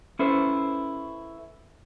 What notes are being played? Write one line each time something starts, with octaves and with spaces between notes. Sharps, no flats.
C#4 E4 A4 B4 C5